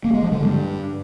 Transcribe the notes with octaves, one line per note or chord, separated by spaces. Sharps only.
A#3
G#3
F3
D3
G2